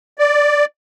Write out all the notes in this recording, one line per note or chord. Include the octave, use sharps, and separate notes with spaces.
D5